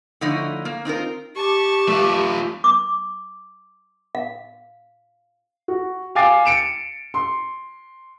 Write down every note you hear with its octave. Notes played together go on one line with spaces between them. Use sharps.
D3 F3 A3 D#4 E4 C#5
A#3
C4 D#4 F4 A#4
G4 A5 C#6
A3 F4
D6
F5
F#4
F5 G5 G#5 D6 A6 C7
C#7 D7 E7
C6